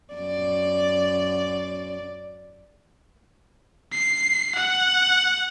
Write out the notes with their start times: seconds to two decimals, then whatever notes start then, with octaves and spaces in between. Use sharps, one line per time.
0.14 F#2 D5
3.92 C7
4.55 F#5